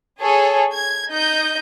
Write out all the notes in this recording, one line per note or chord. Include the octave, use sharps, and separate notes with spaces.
G#4 A4 C#5
G#6
D#4 D#5 G6